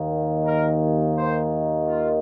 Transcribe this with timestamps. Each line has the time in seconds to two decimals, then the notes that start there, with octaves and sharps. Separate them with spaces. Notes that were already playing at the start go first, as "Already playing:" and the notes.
Already playing: D#2 D#3 A#3
0.44 A#4
1.14 C5
1.84 F4